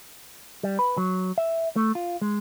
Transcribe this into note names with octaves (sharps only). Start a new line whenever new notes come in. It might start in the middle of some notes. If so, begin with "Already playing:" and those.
G3
B4
F#3
E5
A3
F4
G#3